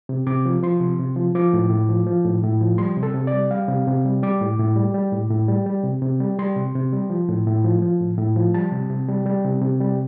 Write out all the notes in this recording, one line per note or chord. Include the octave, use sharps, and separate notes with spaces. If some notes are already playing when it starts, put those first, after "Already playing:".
C3
C3 D6
F3
F3 C6
C3
C3
F3
F3 D6
A2
A2
F3
F3
A2
A2
F3
G3 C6
C3
A4
C3
D5
G3
G3 F5
C3
C3
G3
G3 D6
A2
A2
G3
G3
A2
A2
G3
G3
C3
C3
G3
G3 C6
C3
C3
G3
F3
A2
A2
F3
F3
A2
A2
F3
G3 A5
C3
C3
G3
G3
C3
C3
G3